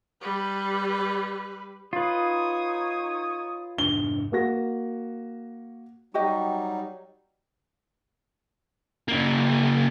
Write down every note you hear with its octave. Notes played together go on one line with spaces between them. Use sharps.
G3 B4
D#4 F4 B4 C#5 D#6
F1 G#2 D4 G7
A#3 F#4 A#6
F#3 G3 D#4 F#4 G4 D#5
C#3 A#3